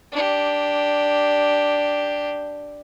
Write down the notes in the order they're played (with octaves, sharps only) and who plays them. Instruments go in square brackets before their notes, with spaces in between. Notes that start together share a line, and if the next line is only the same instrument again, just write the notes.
[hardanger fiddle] D4 G4